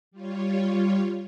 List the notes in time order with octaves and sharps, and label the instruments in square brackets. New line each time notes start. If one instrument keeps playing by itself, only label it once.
[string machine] G3 F4 C#5